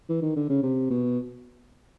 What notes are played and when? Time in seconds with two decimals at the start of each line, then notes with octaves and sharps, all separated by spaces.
0.09 E3
0.22 D#3
0.36 D3
0.49 C#3
0.63 C3
0.90 B2